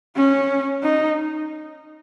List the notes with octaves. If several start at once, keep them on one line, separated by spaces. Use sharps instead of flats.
C#4
D#4